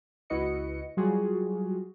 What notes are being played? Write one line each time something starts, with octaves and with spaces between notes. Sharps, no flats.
C#2 E4 F#4 B4 D#5 C#7
F#3 G3 F4 F#4 G#4